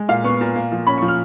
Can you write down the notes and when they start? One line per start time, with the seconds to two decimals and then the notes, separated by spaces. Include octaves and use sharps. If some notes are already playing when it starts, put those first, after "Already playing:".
Already playing: G#3
0.09 A#2 F5
0.24 B3 C#6
0.41 A#2
0.56 A#3
0.72 F3
0.87 C#4 B5
0.98 C#6
1.02 F3
1.08 F6